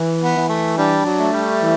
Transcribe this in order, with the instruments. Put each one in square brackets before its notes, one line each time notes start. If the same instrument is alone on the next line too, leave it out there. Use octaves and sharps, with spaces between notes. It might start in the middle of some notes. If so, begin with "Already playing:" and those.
Already playing: [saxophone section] E3
[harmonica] B3
[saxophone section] E3
[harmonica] A3
[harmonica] G3 [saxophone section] D4
[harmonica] F#3
[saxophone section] A3
[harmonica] G3
[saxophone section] E3